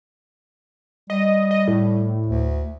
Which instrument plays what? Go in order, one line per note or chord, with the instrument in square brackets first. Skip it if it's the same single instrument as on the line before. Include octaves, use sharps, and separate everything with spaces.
[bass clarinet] G3 [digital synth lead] D#5
[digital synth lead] D#5
A2
[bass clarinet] D2